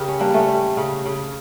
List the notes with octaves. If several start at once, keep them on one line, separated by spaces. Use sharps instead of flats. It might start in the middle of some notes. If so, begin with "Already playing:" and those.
Already playing: C#3 G4 A#4
C#4
G3 A#3 D4
A3 C#4
G3
C#3
C#3